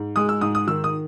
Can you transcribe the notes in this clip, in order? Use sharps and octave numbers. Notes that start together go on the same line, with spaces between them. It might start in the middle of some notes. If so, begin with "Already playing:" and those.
Already playing: G#2
G#3 D#6
E6
G#2 D#6
D#6
D#3 E6
D#6